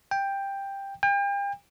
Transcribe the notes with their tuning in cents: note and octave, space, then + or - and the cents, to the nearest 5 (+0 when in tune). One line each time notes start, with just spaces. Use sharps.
G5 +10
G5 +40